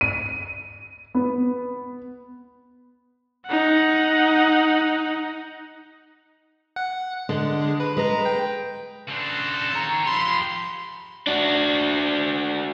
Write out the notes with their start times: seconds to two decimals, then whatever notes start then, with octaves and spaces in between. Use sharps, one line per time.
0.01 D#7
1.15 B3
3.47 D#4 F#5
6.76 F#5
7.29 D3 G#3
7.80 B4
7.97 G#3 B4 A#5
8.26 G5
9.08 C#3 D4 F#4 A4 C5
9.74 D#3 C#5 A#5
10.06 F3 G4 B5 C6
11.27 D4 F#4